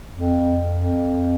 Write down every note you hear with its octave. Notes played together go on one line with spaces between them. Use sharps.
F2
F2